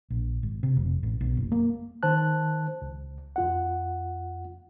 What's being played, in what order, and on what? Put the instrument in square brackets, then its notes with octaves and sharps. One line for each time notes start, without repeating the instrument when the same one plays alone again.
[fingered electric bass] A#1
G#1
C3
F1
A1
B1
F#1
A#3
[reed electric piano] D#3 C5 A5 F#6
C#2
F2 F4 F#5